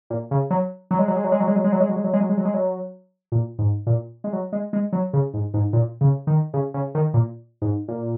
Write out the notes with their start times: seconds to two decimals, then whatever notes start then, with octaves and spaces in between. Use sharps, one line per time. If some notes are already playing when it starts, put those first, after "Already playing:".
0.10 A#2
0.31 C#3
0.50 F#3
0.91 F#3
0.99 G#3
1.08 F#3
1.16 G#3
1.24 F#3
1.32 G#3
1.40 F#3
1.48 G#3
1.56 F#3
1.64 G#3
1.72 F#3
1.80 G#3
1.89 F#3
1.96 G#3
2.04 F#3
2.13 G#3
2.20 F#3
2.29 G#3
2.37 F#3
2.45 G#3
2.54 F#3
3.32 A#2
3.59 G#2
3.87 A#2
4.24 G#3
4.33 F#3
4.53 G#3
4.73 G#3
4.93 F#3
5.13 C#3
5.34 G#2
5.54 G#2
5.73 A#2
6.01 C#3
6.27 D#3
6.54 C#3
6.74 C#3
6.95 D#3
7.14 A#2
7.62 G#2
7.88 A#2